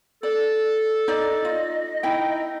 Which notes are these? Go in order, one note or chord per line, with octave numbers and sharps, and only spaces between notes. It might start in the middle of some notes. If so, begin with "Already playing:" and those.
A4 D5
D#4 D5 D#5
F4
D#4 E4 G5